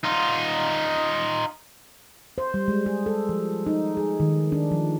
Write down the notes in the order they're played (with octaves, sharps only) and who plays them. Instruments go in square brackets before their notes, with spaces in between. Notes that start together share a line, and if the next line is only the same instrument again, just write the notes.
[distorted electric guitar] D#4 F4
[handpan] C5
G3
G#3
G#4
A4
F3
D#4
G#4
D#3
D4
F3